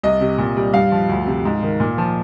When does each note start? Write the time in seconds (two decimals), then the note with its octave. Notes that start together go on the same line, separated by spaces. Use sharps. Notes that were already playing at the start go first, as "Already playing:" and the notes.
0.03 C2 D#5
0.21 C3
0.38 A#2
0.57 G3
0.73 G2 F5
0.92 F3
1.09 D2
1.27 C3
1.45 G#2
1.63 D#3
1.80 A#2
1.98 F3